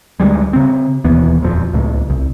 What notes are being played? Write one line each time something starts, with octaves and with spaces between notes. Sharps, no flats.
D2 G3 G#3
C#3 C4
E1 D#2 E3 B3
D#1 F2 F3
C#2 A2
C2